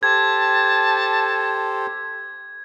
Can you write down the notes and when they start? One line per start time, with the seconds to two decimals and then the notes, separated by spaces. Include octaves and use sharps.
0.03 G4 A4 C5 A5 G#6